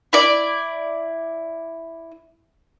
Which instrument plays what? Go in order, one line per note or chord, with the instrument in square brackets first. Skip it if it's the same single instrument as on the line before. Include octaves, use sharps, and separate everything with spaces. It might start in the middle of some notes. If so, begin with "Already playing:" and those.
[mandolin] E4 D5